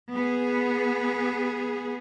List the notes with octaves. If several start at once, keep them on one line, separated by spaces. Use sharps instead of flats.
B3 G#4